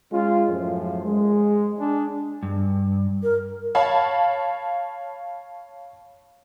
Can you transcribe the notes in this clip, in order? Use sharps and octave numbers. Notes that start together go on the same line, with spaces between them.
G#3 C#4 F4
F#2 A2 F3 C5
G#3
D4 G#4
G2
A#4
C#5 F5 A5 B5